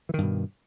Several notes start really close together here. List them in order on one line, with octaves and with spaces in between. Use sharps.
E3 D#3 G2 B2